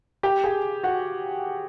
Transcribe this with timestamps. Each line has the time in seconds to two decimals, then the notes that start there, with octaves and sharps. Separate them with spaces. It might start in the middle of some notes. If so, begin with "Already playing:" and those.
0.23 G4 G5
0.44 G#4 G#5
0.83 F#4 F#5